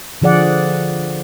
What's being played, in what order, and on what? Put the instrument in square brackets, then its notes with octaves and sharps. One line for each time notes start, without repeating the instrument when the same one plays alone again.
[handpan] D3 F3 G#4 D5 F#5